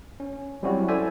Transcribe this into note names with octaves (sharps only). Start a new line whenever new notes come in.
C#4
F#3 G3 C4 C#4 E4 F#4
E4 A4 C5 D5 E5 G#5